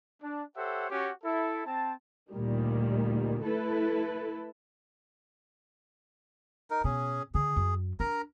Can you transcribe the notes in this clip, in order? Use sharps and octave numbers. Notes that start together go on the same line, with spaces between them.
D4
G4 A4 C5 C#5 E5 F#5
C#4 F#4 G4
E4 A4
C4 A5
D2 A#2 D#3 G3
A3 E4 A4 B4
D#4 A#4
B2 C#4 G#4
D3 G#4
F#2
D4 A#4 A#5